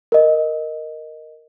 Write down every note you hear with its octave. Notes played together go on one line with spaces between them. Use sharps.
A#4 D#5